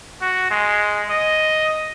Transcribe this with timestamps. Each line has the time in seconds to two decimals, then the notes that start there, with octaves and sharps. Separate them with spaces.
0.22 F#4
0.51 G#3
1.10 D#5